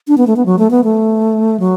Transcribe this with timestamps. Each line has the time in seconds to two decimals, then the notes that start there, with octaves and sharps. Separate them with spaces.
0.08 D4
0.18 B3
0.27 A3
0.36 B3
0.46 F#3
0.59 A3
0.71 B3
0.84 A3
1.60 F#3